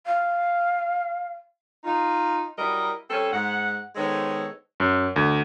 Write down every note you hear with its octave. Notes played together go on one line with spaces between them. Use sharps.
F5
D#4 F4
F#3 G3 E4 A#4 D#5
G3 C4 C#4 A4
G#2 F#5
D#3 G#3 B3 A4 C5 C#5
F#2
D2